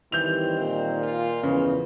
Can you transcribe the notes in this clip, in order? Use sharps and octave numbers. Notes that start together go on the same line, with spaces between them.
D#3 E3 G3 C4 G6 F7
A#2
F4
E2 C#3 F3 G#3 B3